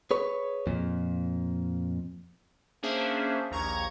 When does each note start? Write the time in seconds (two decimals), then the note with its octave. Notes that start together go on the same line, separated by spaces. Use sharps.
0.11 G#4 B4 C#5
0.67 F2 A#2
2.83 A#3 C#4 D4 G#4 C5 E5
3.51 A#1 D#2 A#5 C#6 G#6